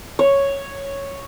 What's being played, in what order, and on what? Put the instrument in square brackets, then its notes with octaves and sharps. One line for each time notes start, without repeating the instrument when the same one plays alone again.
[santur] C#5